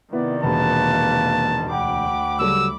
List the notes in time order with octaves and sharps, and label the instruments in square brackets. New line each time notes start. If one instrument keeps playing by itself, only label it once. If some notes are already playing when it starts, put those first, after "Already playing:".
[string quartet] C3 D#3 [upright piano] B3 E4 [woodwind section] D5
[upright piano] E1 [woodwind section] A#3 B4 [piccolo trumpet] A5
[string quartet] D2 B5 D6 [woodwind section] F#5 G5
[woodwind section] C#3 [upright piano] F#3 G3 A4 [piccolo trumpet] E6